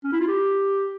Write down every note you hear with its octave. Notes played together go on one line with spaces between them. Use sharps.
C#4
E4
F4
G4